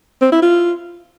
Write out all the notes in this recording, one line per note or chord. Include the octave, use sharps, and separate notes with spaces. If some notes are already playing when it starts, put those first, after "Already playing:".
C4
E4
F4